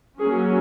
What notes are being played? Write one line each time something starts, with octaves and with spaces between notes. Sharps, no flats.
F#3 A#3 C#4 G#4